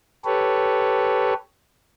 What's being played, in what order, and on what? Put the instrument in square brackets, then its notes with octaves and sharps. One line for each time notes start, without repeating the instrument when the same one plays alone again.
[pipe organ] G4 A4 B4 C#5